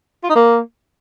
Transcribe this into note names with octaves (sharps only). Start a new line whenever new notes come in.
F4
D#4
A#3